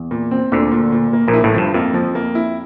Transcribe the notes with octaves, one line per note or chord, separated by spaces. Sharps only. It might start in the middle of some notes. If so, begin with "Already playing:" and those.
Already playing: E2
A#2
C4
D2 A#2 D3
A#2
A#2
A#3
A#1 A#2
E4
A1 A2
G2 F3
F2 A#3
F3
A#3
E4